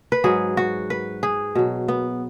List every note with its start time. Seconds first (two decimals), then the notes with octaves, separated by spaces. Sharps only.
0.12 B4
0.24 G#2 F#3 G#4
0.57 F#4
0.90 B4
1.23 G#4
1.55 B2 F#3
1.88 B3